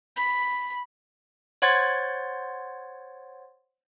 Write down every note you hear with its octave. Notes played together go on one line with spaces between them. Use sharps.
B5
C5 C#5 F#5 C6 G#6 A6